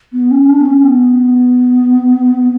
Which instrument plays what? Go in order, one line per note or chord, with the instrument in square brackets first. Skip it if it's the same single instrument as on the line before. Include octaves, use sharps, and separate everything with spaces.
[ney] B3
C#4
D4
B3
C#4
B3